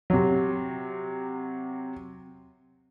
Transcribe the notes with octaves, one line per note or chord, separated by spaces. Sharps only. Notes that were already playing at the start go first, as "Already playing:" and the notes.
C3 F#3